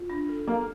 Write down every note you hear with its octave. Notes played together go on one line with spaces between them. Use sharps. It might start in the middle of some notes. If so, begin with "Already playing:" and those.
Already playing: F4
D4
A4
A#3 A4